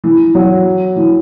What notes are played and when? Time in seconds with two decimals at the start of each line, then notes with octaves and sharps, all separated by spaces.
0.04 E3
0.35 F#3
0.96 E3